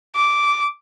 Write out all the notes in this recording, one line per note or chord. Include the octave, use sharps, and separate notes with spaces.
D6